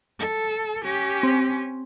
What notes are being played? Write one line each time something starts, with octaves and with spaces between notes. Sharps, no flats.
A4
C#4 G4
C4